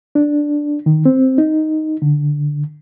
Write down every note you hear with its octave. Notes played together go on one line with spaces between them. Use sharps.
D4
D#3
C4
D#4
D3